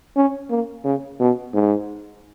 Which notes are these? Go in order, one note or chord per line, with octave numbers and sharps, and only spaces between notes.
C#4
A#3
C#3
B2
G#2